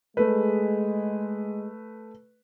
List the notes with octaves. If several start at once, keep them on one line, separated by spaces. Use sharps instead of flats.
G#3 A3 B4